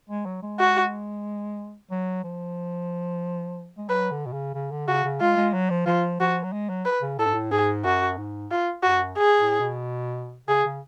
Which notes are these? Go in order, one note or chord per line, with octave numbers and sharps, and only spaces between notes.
G#3
F#3
G#3
F#4
F#3
F3
G#3
F#3 B4
D3
B2
C#3
C#3
D3
C#3 F#4
C#3
G#3 F4
G#3
F#3
F3
F3 F4
F3 F#4
F#3
G#3
F#3
B4
C#3
A2 A4
G#2
A2
G#2 G#4
F#2 F#4
G#2
F4
F#2 F#4
G#4
A2
B2
C#3 G#4
C#3